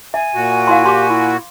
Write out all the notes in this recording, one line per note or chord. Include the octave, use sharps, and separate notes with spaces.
E5 G#5
A#2 F#4
E4 F5 C6
G4 C6 D6
E4